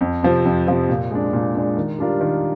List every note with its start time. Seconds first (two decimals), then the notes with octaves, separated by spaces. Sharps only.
0.01 F2
0.23 C3 F3 C4
0.45 F2
0.67 C3 F3 C4
0.89 A#2
1.11 G#3 D4
1.33 A#2
1.55 G#3 D4
1.77 D#3
1.98 G3 D4 F4 A#4
2.21 D#3